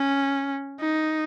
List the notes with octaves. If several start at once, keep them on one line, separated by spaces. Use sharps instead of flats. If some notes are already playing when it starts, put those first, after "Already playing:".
Already playing: C#4
D#4